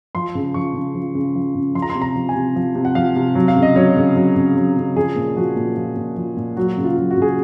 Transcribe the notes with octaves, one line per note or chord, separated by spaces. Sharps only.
F3 C6
C#3
F3 C#6
C#3
F3
C#3
F3
C#3
F3 C6
A#5
C6
C3
A#5
F3
G#5
C3
F3
C3
F#5
F3 F5
C3
F#3
F5
C#3
D#5
F#3 C#5
C#3
F#3
C#3
F#3
C#3
F3 G#4
A#2
F3 F#4
A#2
F3
A#2
F3
A#2
F#3 F#4
C#3
F4
F#3
F#4
C#3 G#4